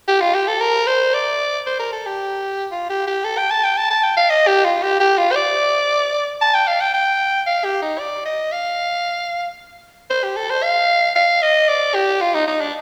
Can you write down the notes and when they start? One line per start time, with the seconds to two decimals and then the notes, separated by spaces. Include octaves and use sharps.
0.08 G4
0.21 F4
0.35 G4
0.48 A4
0.61 A#4
0.87 C5
1.14 D5
1.66 C5
1.80 A#4
1.92 A4
2.06 G4
2.71 F4
2.89 G4
3.07 G4
3.24 A4
3.38 G5
3.50 A5
3.64 G5
3.77 A5
3.90 A5
4.03 G5
4.17 F5
4.30 D#5
4.47 G4
4.65 F4
4.83 G4
5.00 G4
5.18 F4
5.31 C5
5.36 D5
6.41 A5
6.54 G5
6.67 F5
6.81 G5
6.94 G5
7.46 F5
7.64 G4
7.82 D#4
7.99 D5
8.25 D#5
8.52 F5
10.10 C5
10.24 G4
10.36 A4
10.50 C5
10.63 F5
11.16 F5
11.42 D#5
11.68 D5
11.94 G4
12.21 F4
12.34 D#4
12.47 D#4
12.61 D4